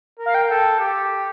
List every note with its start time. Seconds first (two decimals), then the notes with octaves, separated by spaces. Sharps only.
0.19 A#4
0.26 F5
0.35 G5
0.50 A4
0.79 G4